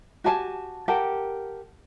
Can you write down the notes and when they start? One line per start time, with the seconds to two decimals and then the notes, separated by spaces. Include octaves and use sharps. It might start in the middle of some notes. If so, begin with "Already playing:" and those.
0.24 F#4 G4 G#5 A5
0.88 G4 A#4 F#5 A5